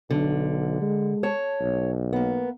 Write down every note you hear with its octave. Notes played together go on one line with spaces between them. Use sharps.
B1 D3
G#3
C#5 A5
B1
A#3 B3